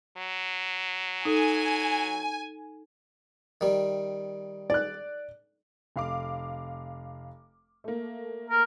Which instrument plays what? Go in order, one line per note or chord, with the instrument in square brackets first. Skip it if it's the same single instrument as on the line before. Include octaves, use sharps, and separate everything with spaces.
[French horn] F#3
[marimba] D#4 A4 [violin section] G#5
[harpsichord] D#3 G3
[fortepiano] D5 F#6
[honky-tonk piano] F1 F5 D6
A3 A#3
[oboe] A#4